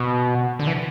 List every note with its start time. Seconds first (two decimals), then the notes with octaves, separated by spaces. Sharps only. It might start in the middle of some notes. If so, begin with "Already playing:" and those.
Already playing: B2
0.59 D3
0.67 E3